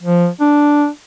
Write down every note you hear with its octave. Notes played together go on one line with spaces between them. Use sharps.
F3
D4